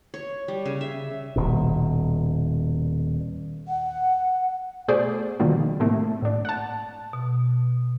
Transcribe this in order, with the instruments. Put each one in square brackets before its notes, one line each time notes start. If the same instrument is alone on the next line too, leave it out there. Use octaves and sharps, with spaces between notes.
[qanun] C#5
G3
C#3
E5
[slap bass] D#1 B2
[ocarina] F#5
[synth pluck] B2 A3 G#4 C5 D5
B2 D3 D#3 F3 G3 A#3
A2 C3 A3 A#3
A2 D4
F#5 A5
[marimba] B2